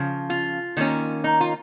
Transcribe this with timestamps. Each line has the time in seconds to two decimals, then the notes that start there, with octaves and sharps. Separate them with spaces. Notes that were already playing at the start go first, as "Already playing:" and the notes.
Already playing: C#3 F3
0.30 F4
0.77 D#3 A#3 C#4
1.24 D#4
1.41 F4